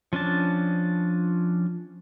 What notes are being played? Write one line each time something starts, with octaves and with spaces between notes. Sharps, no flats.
F3 C#4 D4 A5